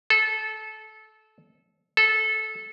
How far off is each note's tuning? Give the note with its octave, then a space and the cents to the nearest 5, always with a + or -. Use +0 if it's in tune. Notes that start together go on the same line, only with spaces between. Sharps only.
A4 -20
A4 -15